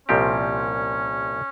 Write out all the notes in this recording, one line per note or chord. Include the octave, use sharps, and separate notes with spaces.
C2 A#2 F3 C4 C#4 G4